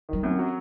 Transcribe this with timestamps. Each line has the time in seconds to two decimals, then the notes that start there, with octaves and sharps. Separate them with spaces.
0.09 D#3 F#3
0.23 F#2 C4
0.39 F#3